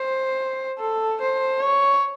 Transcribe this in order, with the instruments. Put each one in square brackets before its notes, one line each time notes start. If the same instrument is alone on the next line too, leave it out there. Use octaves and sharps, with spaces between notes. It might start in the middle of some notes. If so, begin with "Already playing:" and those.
Already playing: [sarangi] C5
A4
C5
C#5